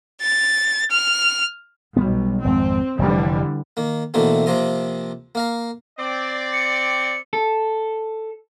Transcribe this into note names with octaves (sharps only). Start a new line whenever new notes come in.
A6
F6
B1 G3 G#3 B3
G#1 F2 G#3 C4
F1 D3 E3 G3
D#3 A#3
B2 D3 E3 A3 A#3 C4
C3 F3 A#3 C4 A#5 D#6
A#3 F5 A#5
C4 D5
C#7
A4